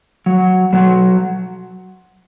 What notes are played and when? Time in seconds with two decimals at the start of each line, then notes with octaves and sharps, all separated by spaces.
0.26 F#3
0.73 B2 F#3